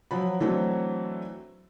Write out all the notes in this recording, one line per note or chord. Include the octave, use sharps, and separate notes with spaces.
F3 F#3 B5
E3 F#3 A3 C4 D4